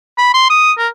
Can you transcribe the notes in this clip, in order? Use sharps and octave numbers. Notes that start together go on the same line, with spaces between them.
B5
C6
D#6
A#4